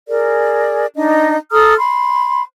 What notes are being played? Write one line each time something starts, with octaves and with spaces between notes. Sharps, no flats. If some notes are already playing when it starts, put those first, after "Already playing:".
G#4 A#4 D5
D4 D#4 D#5
A4 A#5 D#6 F6
B5 C6